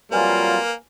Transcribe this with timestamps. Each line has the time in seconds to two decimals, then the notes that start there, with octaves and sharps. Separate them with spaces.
0.12 F2 F#3 G3 A#3 F4 B4 G#5 F6